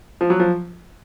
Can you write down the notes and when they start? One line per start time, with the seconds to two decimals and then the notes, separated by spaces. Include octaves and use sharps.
0.21 F3
0.30 F#3
0.40 F3